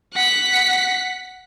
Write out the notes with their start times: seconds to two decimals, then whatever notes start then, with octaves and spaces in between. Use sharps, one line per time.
0.13 F#5 B6